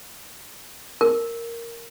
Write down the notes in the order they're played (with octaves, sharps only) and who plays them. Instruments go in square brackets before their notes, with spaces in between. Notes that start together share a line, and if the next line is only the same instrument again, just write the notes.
[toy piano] A#4